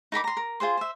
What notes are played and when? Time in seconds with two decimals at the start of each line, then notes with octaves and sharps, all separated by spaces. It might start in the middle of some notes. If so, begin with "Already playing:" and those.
0.12 D#4 A#4 B5 D6
0.24 A#5 C6
0.37 A#4
0.60 F4 G#4 C5 C6
0.77 C5 E5